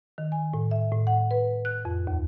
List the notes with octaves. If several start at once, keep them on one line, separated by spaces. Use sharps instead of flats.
D#3
G#5
A2
E5
A2
F#5
B4
F#6
F2
D#2